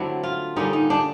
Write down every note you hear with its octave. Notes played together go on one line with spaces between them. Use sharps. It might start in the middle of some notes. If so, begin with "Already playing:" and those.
Already playing: D3 F#3 A3 C4 E4
F4
D3 G3 A#3 C#4 D#4
D#4
D4